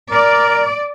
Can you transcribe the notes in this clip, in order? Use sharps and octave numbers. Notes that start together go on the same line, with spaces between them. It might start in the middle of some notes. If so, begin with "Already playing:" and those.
A#4 D5